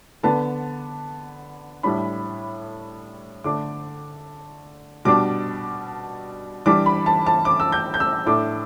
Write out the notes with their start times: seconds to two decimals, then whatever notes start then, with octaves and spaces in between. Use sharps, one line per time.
0.23 D3 B3 D4 A5
1.83 A2 G3 D4 B5
3.44 D3 A3 D4 D6
5.05 B2 G3 D4 D6
6.66 E3 G3 D4 D6
6.86 B5
7.06 A5
7.26 A5
7.45 D6
7.60 E6
7.72 G6
7.94 G6
8.00 E6
8.26 A2 A3 D4 D6